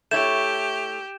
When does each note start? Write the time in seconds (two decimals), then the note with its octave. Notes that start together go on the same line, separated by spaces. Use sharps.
0.11 A3 E4 G4 C#5 G6 E7